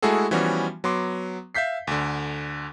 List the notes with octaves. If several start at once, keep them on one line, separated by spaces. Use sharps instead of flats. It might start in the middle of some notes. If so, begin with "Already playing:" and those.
G#3 A3 E4 F#4 G#4 A4
E3 F3 G3 B3 C#4 F#4
F#3 B3 C6 D6
E5 F5 G6 B6 C7
D2 D3